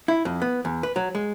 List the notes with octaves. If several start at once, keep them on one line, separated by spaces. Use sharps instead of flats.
E4
F2
B3
E2
B4
F#3
G#3